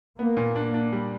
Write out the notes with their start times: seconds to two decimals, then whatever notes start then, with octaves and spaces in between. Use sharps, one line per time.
0.19 A#3 B3
0.37 A#2
0.56 D4
0.74 D4
0.93 G3